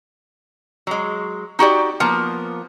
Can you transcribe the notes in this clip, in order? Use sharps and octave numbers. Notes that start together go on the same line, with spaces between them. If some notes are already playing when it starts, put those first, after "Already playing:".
F#3 G#3
D#4 F#4 G4 D5
F3 A#3 B3